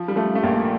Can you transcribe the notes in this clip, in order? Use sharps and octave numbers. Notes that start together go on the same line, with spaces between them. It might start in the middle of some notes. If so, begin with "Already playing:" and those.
Already playing: F3
G3
F3 A3
A3
A#1 A#2 A#3